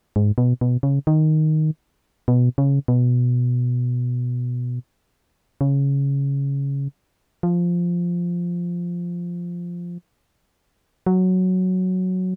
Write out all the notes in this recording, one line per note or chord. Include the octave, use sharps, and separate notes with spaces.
G#2
B2
B2
C#3
D#3
B2
C#3
B2
C#3
F3
F#3